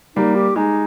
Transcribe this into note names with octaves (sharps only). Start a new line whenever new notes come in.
G3 A#3 D#4
G4
G#3 D#4